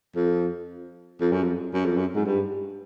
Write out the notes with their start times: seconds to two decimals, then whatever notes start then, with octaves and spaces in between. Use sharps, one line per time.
0.15 F2
1.21 F2
1.32 F#2
1.43 F2
1.74 F#2
1.85 F2
1.97 F#2
2.15 G#2
2.26 G2